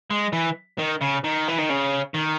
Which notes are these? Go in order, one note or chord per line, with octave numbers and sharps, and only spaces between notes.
G#3
E3
D#3
C#3
D#3
E3
D#3
C#3
D#3